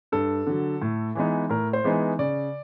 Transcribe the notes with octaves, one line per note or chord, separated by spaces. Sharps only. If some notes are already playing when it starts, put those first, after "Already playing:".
G2 A4
D3 F#3
A2
E3 G#3 B3 D#4
A2 A#4
C5
E3 G#3 B3 D#4
C#3 D5